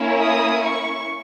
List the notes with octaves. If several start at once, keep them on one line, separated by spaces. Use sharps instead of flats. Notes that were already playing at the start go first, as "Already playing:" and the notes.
Already playing: A#3 C#4 E4
D#6
C#6